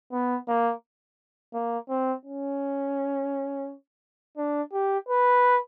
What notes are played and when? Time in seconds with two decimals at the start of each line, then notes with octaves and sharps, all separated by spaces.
0.12 B3
0.48 A#3
1.54 A#3
1.89 C4
2.26 C#4
4.37 D4
4.73 G4
5.09 B4